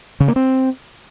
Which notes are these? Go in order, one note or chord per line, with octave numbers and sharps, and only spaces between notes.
C#3
A#3
C4